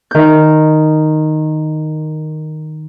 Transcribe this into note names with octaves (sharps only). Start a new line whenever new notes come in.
D#3 G6